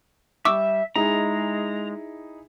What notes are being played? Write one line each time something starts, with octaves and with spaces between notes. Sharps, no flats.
G3 E5 C#6 D6 E6
G#3 D#4 E4 G#4 A#5